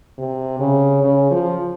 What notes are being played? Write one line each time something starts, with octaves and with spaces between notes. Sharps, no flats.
C3
C#3
C#3
F3